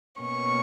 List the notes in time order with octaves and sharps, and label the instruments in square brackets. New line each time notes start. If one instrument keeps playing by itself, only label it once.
[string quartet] B2 A#3 C#4 C#6